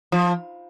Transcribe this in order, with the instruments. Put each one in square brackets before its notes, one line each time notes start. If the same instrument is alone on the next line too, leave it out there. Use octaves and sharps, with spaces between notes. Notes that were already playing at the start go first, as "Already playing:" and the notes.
[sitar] F3